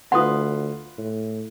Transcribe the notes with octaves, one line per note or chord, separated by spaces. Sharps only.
D2 F4 B4 F#5 C6 D#6
A2